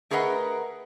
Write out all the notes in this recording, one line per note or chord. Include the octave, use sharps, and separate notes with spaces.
A3 G#4 A#4 B4 D#5 F#5